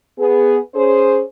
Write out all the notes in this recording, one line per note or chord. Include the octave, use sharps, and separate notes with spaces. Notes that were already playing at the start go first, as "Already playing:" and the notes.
B3 G#4
C#4 G#4 C5